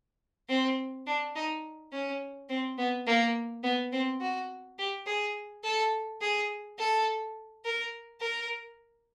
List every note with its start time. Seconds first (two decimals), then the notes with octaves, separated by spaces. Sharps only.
0.49 C4
1.07 D4
1.35 D#4
1.92 C#4
2.49 C4
2.78 B3
3.07 A#3
3.63 B3
3.92 C4
4.21 F#4
4.78 G4
5.06 G#4
5.64 A4
6.21 G#4
6.78 A4
7.65 A#4
8.21 A#4